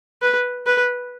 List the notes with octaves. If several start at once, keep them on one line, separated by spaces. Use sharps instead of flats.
B4
B4